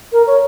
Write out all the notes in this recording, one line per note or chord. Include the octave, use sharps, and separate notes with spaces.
A#4
C#5